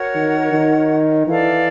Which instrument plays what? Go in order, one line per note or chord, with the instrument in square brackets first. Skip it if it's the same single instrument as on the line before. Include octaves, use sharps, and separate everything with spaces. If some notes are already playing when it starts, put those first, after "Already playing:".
Already playing: [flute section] F#4 A#4 C#5 F#5
[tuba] D#3
D#3
[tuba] E3 [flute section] A4 D5 F5